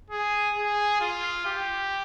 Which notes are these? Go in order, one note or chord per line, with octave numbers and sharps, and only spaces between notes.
G#4
G#4
F4
G4